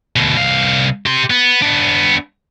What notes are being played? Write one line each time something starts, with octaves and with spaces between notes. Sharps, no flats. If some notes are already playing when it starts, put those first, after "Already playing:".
D2 B2
C2 F5
G4 C6
B3
B3 D4